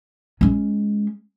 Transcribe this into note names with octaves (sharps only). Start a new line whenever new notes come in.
G#3 C#4